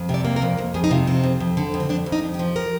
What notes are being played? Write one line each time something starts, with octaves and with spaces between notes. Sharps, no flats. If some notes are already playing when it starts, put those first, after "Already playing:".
Already playing: F2
C3
D5
A#3
A#4
F2
F2 A#4
F2 G#4
D#4
C3 F4
F2 C4
F2
F2
D3
F2
C4
F2 D4
F2
D#4
F2
G4
F3
A#4